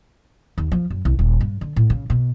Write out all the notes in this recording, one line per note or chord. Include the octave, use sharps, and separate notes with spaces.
D#2
F3
F#2
C2
D#1
G2
D3
A2
C#3
B2